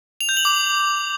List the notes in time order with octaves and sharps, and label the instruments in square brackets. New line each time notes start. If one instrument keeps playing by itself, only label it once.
[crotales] F7
G6
F#7
D6